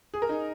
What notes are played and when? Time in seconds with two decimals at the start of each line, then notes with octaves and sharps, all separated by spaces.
0.14 G#4
0.22 A#4
0.29 D#4 G#4